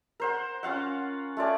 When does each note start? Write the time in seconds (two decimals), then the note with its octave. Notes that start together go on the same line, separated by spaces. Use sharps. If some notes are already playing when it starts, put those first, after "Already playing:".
0.20 A#4 C5 F#5
0.63 C#4 F4 F5 F#5
1.37 A3 F4 D5 G#5